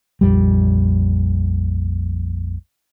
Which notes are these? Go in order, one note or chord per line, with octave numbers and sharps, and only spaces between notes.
A#1 F2 G3